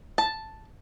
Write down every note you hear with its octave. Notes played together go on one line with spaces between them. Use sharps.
A5